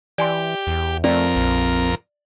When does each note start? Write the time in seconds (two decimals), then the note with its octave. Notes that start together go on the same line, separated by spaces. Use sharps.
0.18 E3 G4 D5 G#5 C6
0.67 E2
1.04 F2 A3 C4 A#4 D5
1.36 A#1